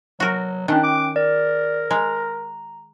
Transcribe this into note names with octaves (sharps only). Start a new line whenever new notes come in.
F#3 F#4 A#4
D#3 C#4 D4 G5 F#6
D6
A#4 D5
G#3 A#5